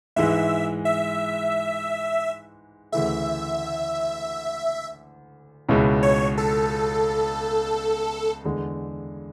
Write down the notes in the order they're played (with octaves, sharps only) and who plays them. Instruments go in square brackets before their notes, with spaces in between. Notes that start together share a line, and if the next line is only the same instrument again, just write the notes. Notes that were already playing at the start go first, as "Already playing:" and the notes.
[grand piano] G#2 E3 G#3 [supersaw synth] E5
[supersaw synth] E5
[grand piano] D2 C#3 E3 A3 [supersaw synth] E5
[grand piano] C#2 B2 G#3 C#4 E4
[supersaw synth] C#5
A4
[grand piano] E2 D3 G#3